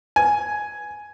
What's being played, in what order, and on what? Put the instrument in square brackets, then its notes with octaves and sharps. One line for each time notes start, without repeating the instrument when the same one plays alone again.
[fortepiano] G#5